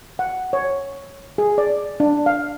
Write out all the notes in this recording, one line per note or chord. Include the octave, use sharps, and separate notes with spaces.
F#5
C#5
G#4
D5
D4
F5